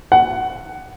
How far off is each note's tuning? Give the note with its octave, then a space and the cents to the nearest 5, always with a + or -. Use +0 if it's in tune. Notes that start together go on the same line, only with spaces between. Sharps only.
F#5 +15